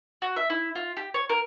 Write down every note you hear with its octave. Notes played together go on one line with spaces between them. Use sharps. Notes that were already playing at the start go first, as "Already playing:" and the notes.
F#4
E5
E4
F4
G4
C#5
A#4